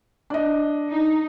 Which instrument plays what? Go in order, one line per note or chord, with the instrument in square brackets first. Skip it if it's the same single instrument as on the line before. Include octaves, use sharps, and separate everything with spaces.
[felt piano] D4 D#5
[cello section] D#4